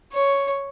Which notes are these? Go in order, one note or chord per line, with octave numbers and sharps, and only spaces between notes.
C#5